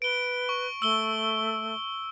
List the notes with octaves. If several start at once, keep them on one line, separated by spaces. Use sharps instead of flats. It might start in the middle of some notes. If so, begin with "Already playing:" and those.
B4 D7 G7
C#6
A3 E6 G7